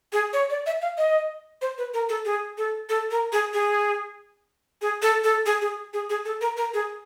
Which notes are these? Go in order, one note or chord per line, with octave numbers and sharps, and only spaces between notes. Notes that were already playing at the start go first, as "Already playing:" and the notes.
G#4
C#5
D5
E5
F5
D#5
C5
B4
A#4
A4
G#4
A4
A4
A#4
G#4
G#4
G#4
A4
A4
G#4
G#4
G#4
G#4
A4
A#4
A#4
G#4